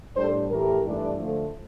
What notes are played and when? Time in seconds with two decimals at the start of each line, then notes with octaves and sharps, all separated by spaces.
0.16 A2 G3 D4 A4 C5
0.50 A2 E3 A3 G4 A#4
0.84 G2 E3 A3 D4
1.18 D3 F3 A3